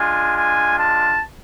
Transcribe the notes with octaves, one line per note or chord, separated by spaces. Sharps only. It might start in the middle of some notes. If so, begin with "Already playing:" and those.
Already playing: G#3 D4 F4 G#5
G#5
A5